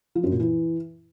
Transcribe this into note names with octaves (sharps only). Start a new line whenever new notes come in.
F3
F#2
A#2
E3